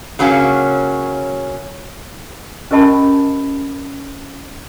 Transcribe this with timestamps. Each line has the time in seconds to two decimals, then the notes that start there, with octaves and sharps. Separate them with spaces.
0.19 C#3 F#3 A#3 C#4
2.71 C#4 G4 A#4 D#5 A5 B5